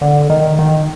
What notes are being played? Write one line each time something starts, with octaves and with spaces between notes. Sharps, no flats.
D3
D#3
D#3